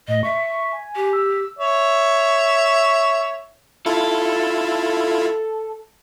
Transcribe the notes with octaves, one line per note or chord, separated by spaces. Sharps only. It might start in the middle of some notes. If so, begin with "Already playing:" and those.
A2 D#5
E5 C#6
G#5
G4
E6
C#5 E5
E4 F4 A4